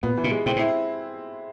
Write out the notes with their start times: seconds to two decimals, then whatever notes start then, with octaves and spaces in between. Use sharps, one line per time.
0.03 A#2 B3
0.17 E3
0.24 A#2
0.31 G#3
0.46 A2 C4
0.56 A2
0.59 E4